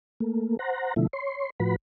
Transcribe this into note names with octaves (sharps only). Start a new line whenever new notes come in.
A3 A#3
C5 F#5 A#5
B2 D3 F3 A3 E4
C#5 C6
A2 F3 F#4 B4 B5